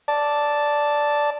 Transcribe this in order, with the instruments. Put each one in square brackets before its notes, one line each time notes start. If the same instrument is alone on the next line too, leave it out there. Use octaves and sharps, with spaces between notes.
[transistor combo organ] D5 A5